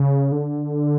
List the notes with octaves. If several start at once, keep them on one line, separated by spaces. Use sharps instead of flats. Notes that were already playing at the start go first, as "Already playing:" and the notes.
Already playing: C#3
D3